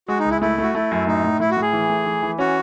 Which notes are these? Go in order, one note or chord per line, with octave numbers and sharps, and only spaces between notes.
G#3 F#4
D#4
C#2
E4
A3 E4
A3 F#4
A3 E4
F#2
A2 D#4
A2
A2 E4
F#4
A2
G#4
E3
A3
E3
E3
C#4 F#4